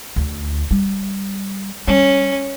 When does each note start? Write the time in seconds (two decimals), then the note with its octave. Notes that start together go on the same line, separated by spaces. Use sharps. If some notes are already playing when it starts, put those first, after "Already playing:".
0.16 D2
0.71 G3
1.88 G3 C#4